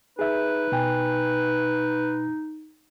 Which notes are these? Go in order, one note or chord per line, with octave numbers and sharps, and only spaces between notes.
D#4 G#4 B4 E5
B2 G5 G#5